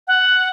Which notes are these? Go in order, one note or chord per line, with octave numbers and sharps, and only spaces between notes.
F#5